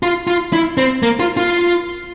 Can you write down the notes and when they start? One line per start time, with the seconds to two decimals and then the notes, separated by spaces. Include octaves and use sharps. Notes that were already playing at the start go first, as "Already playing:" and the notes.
0.03 F4
0.27 F4
0.53 E4
0.77 C4
1.03 A#3
1.20 F4
1.37 F4